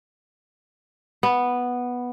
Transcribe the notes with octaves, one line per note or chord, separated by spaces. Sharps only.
B3